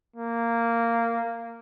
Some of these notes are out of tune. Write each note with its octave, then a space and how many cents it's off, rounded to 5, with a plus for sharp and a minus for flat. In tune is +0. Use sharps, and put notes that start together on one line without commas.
A#3 -10